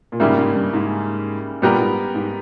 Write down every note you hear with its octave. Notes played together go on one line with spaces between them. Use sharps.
A#2
G#2 C#3 G3 A#3 E4
G#2
G2
G#2
G2 A#2 G3 B3 G4 A#4
G#2
G#2